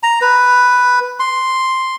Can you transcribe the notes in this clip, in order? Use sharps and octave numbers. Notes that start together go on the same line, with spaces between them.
A#5
B4
C6